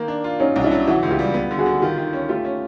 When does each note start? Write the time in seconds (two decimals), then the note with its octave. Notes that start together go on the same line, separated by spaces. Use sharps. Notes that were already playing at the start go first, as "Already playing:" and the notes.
Already playing: D#3 A#3
0.08 D4
0.24 F4
0.40 F#3 C#4 D#4
0.56 C2
0.64 D4 E4
0.71 F#3
0.87 E3 E4 F#4
1.03 C#2
1.10 F4 G4
1.19 G3
1.34 B3
1.51 D3
1.58 F#4 G#4
1.66 D3
1.81 D#3 F4 G4
1.98 D#3
2.13 C#4
2.29 A3 F4 G4
2.45 C#4